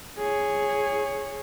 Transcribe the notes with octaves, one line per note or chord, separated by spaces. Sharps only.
G#4 C#5